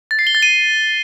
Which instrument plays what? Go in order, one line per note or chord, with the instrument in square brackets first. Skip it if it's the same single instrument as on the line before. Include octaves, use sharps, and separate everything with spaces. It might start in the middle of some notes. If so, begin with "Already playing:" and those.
[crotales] A6
C7
G7
A6
D#7